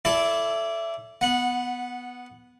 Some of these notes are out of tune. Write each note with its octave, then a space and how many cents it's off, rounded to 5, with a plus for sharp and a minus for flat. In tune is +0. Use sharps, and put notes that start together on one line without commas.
E4 +20 A4 -5 D5 -15
B3 +0 F#5 -15